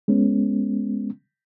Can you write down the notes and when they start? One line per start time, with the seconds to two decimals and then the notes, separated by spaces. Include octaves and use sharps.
0.08 G#3 B3 C#4